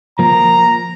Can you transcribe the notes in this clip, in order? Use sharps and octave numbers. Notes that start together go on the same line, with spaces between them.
F3 A#3 A#5